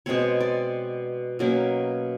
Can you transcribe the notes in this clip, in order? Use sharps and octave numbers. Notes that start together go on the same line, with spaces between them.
B2 G#3 C4 C#5
D5
B2 F#3 A#3 C#4